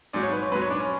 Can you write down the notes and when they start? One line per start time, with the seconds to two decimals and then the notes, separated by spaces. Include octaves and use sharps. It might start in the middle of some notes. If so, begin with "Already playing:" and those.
0.13 G#2 F#3 D5
0.23 C#5
0.33 B4
0.42 C#5
0.52 G#2 B4
0.55 F#3
0.62 C#5
0.71 D4
0.80 C#4